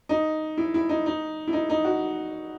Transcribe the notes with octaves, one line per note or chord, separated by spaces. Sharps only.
D#4
E4
E4
D#4
D#4
E4
D#4
D#4
F#4